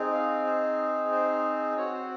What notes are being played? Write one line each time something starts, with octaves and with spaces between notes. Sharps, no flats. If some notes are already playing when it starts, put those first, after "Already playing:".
Already playing: C4 D#4 G#4
F5
C5
C5
C4 F#4 C#5
C5